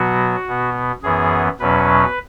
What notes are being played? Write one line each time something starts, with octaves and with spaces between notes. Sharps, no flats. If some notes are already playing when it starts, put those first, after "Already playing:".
Already playing: B2 F#3 B3 F#4
B2 B3
F#2 E3 B3 G#4
E2 B2 F#3 C#4 B4